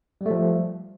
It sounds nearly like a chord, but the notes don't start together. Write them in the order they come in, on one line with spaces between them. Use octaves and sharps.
G3 A3 F3